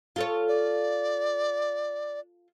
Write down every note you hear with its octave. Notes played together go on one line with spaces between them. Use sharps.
F4 A4 C#5
D5